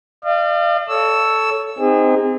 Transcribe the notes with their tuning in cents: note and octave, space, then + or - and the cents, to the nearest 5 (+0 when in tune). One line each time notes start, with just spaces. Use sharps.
D5 +45 F5 -30
A4 +0 C#5 +15 E6 +0
C4 -20 D#4 +0 G#4 -35